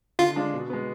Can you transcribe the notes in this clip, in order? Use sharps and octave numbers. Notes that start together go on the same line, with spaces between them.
D3 F4
G#3 D4 F4
B2
G#3 B3